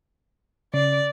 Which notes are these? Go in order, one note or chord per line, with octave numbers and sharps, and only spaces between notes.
C#3 D5